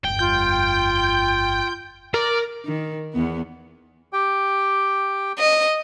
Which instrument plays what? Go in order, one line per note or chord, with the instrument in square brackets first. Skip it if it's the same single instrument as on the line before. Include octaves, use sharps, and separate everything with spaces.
[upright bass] G1 F2 [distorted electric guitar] G5
[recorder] F4 [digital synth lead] G6
[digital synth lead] A#4 [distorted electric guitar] D5
[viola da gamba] D#3
E2 B3
[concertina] G4 G5
[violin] D#5